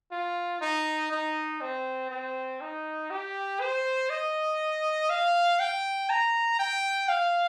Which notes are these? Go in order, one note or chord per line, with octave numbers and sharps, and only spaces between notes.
F4
D#4
D#4
C4
C4
D#4
G4
C5
D#5
F5
G5
A#5
G5
F5